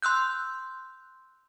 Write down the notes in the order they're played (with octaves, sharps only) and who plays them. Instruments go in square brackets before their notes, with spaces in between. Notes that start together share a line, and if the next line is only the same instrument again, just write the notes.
[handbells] C6 E6 F#6 G6